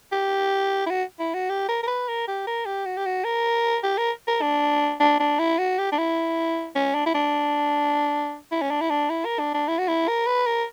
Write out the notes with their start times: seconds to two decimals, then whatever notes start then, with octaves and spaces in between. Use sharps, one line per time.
0.12 G4
0.86 E4
0.90 F#4
1.20 E4
1.34 F#4
1.50 G4
1.69 A#4
1.83 A#4
1.87 B4
2.08 A#4
2.28 G4
2.47 A#4
2.65 G4
2.85 F#4
2.97 G4
3.06 F#4
3.25 A#4
3.83 G4
3.98 A#4
4.27 A#4
4.42 D4
5.00 D4
5.20 D4
5.39 E4
5.58 F#4
5.79 G4
5.92 D4
5.98 E4
6.76 C#4
6.95 D4
7.06 E4
7.15 D4
8.51 E4
8.62 C#4
8.71 D4
8.81 E4
8.90 D4
9.10 E4
9.25 A#4
9.39 D4
9.54 D4
9.68 E4
9.78 F#4
9.88 E4
10.08 A#4
10.27 B4
10.46 A#4